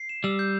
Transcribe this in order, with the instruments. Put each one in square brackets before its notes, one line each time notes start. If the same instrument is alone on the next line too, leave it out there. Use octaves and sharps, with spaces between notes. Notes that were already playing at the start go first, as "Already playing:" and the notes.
Already playing: [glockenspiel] C7
E7
[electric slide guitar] G3 [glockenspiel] E6
[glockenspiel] G6